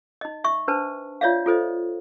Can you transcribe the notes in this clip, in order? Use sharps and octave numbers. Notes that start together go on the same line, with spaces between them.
D#4 D#5
E5 C#6
D4 B4 C5 A5
F4 C#5 D5 E5 F5
F4 A4 C5 D#5